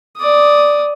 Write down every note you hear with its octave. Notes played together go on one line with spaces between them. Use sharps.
D5 D#6